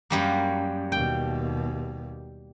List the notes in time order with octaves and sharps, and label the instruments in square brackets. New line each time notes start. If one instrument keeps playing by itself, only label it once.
[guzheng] F#2 G3 A#3
[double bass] D#2 B2 [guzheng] G5